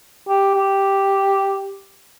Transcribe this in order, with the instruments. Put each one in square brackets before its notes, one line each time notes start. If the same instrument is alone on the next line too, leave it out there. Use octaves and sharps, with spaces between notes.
[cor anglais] G4
G4